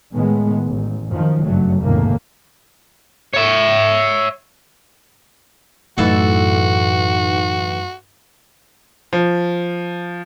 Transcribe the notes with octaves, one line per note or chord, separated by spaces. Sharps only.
A2 D#3 G#3 B3
A1
F#2 D#3 F3
F#1 G2 F#3 A3
F1 D#2 G#2 C#3 A3 A#3
C#5 E5
F#2 A2 E3 D#4 F#4 A4 B4 F5
F3